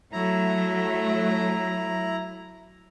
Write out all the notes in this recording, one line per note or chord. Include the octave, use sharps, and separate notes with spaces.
F#3 A3 E4 A#5